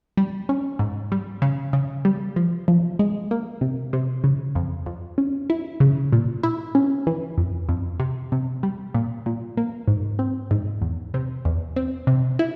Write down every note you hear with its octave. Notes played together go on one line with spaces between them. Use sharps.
G3
C#4
G#2
G3
C#3
C#3
G3
F3
F3
G#3
A#3
C3
C3
C#3
F2
F2
C#4
E4
C#3
A#2
E4
C#4
E3
F2
F2
C3
C3
G3
A#2
A#2
A#3
G#2
C4
G#2
E2
C3
E2
C4
C3
E4